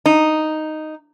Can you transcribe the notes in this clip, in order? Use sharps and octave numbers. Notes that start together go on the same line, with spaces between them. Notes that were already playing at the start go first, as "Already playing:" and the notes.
D#4